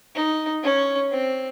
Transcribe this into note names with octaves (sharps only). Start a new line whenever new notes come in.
D#4
C#4
C4